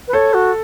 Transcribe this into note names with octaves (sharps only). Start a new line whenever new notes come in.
B4
A4 C#5
F#4